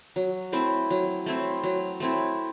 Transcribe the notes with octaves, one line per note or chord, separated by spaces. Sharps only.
F#3
A3 C4 E4
F#3
A3 C4 E4
F#3
A3 C4 E4